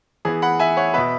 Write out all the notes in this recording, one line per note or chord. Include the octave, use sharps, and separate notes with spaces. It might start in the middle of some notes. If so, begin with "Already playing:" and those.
E3 B3 G#4
F#5 B5
E5 G#5
C#5 F#5
B2 B3 B4 E5